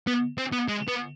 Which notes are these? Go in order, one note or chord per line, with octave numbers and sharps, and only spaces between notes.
B3
C4
B3
G#3
B3